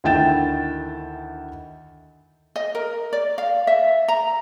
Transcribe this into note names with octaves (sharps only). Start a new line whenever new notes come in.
D2 D#3 E4 G5 A6 E7
D#5
A#4
D5
F5
E5
A#5